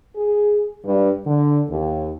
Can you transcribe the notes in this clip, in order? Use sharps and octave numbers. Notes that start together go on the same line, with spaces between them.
G#4
G2
D3
D#2